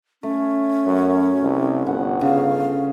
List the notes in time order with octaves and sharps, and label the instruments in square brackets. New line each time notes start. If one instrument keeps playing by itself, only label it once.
[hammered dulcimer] A3 [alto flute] C#4
[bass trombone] F#2
C2
[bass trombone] G1 [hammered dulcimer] F#5
[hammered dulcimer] C#3 [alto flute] F5